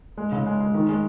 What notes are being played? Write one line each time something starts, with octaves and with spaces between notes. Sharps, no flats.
G#3
C#3
G#3
G#3
D#3
G#3